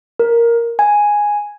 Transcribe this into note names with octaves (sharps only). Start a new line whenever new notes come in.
A#4
G#5